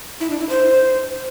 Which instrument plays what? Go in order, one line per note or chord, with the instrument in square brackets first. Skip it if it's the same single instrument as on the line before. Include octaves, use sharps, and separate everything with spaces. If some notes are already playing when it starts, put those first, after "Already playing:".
[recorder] E4
D4
E4
C5